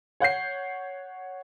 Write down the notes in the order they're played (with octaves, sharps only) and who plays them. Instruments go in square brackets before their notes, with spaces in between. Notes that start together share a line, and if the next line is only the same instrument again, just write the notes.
[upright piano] C#5 F#5 G6 C7